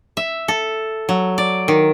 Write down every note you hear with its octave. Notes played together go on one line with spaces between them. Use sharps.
E5
A4
F#3
D5
D#3